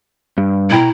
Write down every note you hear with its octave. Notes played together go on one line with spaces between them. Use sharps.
G2
B2 E4 G5 A#5